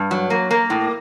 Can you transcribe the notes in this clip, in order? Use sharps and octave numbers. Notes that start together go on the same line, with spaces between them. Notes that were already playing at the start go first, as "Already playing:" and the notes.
Already playing: G2
F#3
A#3
A#3
A2